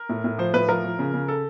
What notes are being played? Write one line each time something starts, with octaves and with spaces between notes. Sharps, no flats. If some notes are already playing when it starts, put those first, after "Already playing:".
Already playing: A#4
A2
A2
F3 C5
A2 B4
F3 A#4
F3
C#3
C#3
A4